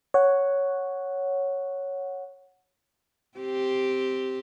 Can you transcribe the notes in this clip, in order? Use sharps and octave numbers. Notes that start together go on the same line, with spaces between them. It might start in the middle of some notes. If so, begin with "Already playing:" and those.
C#5 F#5
C4 G4